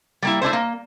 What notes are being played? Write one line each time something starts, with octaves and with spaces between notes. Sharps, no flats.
G3 A#3 E4
A3 D4 E4 C5
A#3